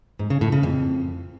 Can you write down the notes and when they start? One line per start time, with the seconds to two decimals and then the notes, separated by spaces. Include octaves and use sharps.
0.19 G#2
0.30 C#3
0.41 A2
0.52 C#3
0.63 F2